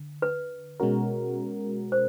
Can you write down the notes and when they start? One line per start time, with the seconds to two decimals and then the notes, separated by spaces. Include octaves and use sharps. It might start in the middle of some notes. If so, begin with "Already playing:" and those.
Already playing: D3
0.22 B4
0.80 B2 G#3 C#4 F#4 A#4
1.92 C5